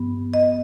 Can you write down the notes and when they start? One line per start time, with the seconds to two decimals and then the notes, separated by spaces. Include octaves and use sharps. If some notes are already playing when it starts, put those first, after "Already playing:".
Already playing: G2 F3 B3
0.34 D#5